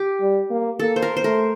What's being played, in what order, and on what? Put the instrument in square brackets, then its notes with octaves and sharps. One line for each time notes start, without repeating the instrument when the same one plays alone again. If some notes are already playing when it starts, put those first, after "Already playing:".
Already playing: [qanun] G4
[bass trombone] G3
A#3
[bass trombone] A#3 [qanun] A4
[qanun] C5
A#4
C5
[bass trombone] A3 [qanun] A#4